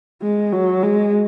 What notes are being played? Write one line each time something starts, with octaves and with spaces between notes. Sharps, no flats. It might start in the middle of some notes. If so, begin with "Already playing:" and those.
G#3
F#3
G#3